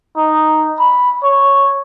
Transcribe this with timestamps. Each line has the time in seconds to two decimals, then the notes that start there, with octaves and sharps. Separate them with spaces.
0.17 D#4
0.80 B5
1.24 C#5